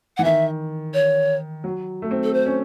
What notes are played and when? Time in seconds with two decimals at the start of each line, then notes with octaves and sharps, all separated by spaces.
0.17 E3 F#5
0.24 D#3 E5
0.94 C#5
1.64 F#3
2.02 A3
2.11 C4
2.24 A4
2.34 C5
2.46 C#4